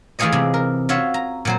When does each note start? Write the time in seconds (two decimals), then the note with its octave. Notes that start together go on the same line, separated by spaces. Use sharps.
0.19 E3 A3 F4 G#4 C#5 D#5
0.32 C3 G#3
0.54 A#4
0.89 F4 F#4 C#5 E5 F5
1.14 A#5
1.45 A#2 F#3 C5